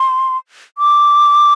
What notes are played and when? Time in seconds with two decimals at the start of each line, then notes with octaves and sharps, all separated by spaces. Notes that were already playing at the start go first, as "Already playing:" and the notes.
Already playing: C6
0.78 D6